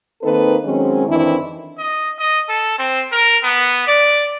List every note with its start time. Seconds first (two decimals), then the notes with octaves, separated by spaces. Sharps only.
0.23 D#3 A#3 C4 D#4 A4 B4
0.64 D#3 F#3 G#3 C4 C#4
1.08 F2 D#3 E3 C4 D4 E4
1.78 D#5
2.19 D#5
2.49 A4
2.79 C4
3.12 A#4
3.43 B3
3.88 D5